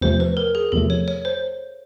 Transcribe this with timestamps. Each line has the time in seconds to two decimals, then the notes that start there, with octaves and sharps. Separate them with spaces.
0.01 E2 C3 F3 A3 C5
0.20 B4
0.37 A#4
0.55 G#4
0.72 E2 C3 F3 A3 A4
0.90 C#5
1.08 C#5
1.25 C5